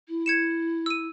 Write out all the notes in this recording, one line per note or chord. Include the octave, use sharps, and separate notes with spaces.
E4
G#6 C#7 E7
E6 D#7